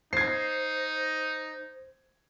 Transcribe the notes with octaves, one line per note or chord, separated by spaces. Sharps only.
D#4 C5 G#6 C7